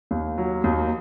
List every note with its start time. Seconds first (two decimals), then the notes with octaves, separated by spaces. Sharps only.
0.11 D#2
0.38 F#3
0.64 D#2